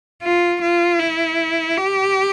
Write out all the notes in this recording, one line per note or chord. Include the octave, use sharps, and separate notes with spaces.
F4
F4
E4
G4